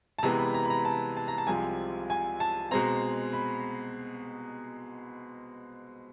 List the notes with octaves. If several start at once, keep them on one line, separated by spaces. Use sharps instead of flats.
A5
C3 E3 G#3 B3 A#5
B5
A#5
B5
A#5
A5
A5
A#5
A5
C2 C3 F3 G#3 G#5
G#5
A5
B2 G#3 C4 A#5
B5